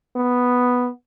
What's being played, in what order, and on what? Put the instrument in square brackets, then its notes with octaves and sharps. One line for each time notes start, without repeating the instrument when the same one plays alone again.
[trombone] B3